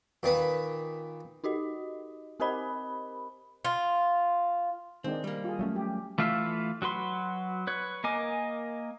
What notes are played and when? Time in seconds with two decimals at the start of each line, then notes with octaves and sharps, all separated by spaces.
0.23 A#2 D#3 B4 B5
1.44 D#4 F#4 G4 D#5
2.40 C4 G4 A#4 C5 D#5 B5
3.65 F4
5.04 D#3 G#3 C4 D4
5.24 G3 A#3
5.44 F4 G#4
5.59 F#3 A3 C#4
5.76 G4
6.18 E3 A3 F4 E5 F5
6.82 F#3 F#4 B4 C6
7.67 B4 C#5
8.04 A#3 A#4 D#5 G#5 D6